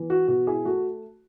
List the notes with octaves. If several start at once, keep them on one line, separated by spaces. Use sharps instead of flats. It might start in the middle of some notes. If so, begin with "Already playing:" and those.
Already playing: E3 B3
F#4
B2 F#4
E4 G#4
A3 F#4